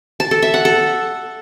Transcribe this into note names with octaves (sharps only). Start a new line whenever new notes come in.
A5
A4
E5
F#5
A4